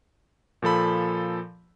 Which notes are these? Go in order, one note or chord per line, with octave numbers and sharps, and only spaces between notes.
A#2 F3 A4 B5